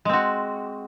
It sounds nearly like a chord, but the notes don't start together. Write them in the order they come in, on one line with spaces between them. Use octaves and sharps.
G#3 C4 F#4